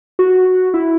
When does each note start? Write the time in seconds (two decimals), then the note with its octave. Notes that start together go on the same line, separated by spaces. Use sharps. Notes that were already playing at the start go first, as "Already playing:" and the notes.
0.19 F#4
0.74 E4